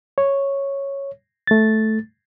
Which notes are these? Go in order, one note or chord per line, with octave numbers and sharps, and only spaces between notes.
C#5
A3 A6